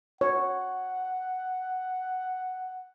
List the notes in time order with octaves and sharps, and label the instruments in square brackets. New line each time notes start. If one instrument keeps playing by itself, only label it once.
[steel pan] C#5 [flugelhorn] F#5